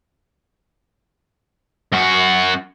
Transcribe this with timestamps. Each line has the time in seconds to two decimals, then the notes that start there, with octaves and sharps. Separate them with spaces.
1.92 F#2 F#4